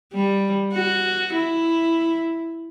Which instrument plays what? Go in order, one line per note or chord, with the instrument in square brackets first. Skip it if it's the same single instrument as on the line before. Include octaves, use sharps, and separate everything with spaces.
[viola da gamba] G3
F#4
E4